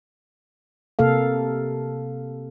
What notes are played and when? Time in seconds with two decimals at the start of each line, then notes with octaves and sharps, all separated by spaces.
0.99 C3 A#3 A4 F5